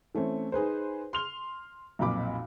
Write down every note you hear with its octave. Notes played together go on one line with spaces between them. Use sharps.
E3 A3 C4 C#4
D#4 G#4 B4 C5
C6 F6 F7 G7
B1 F2 A#2 B5 D6